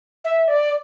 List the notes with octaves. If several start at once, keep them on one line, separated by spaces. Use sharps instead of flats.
E5
D5